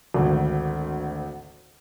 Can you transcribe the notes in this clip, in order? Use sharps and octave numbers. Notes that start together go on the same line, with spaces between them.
G#1 D2